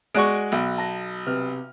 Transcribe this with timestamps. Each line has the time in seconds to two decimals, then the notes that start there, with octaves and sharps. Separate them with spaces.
0.15 G#3 F#4 D5 C#6 F#6 D7
0.52 B1
0.78 A5 A#6
1.26 C3 B4 F6